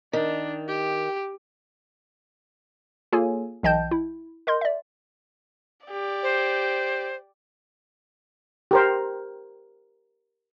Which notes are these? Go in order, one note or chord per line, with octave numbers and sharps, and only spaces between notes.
D#3 D4
G4
A#3 F4 G#4 A4 C#5 G#5
B1 E3 D#5 G5 A5 G6
E4
A#4 D#5 C6 G6
D5 E5
G4 D5
C5
G4 A#4 C5